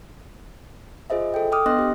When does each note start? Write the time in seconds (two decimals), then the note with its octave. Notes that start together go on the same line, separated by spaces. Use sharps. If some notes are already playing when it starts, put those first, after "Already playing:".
1.10 F4 G#4 C5 D#5 E5
1.34 A4 G5
1.52 G5 D6 D#6 F6
1.66 B3 D4 D#5 C6 F#6 A#6
1.79 G4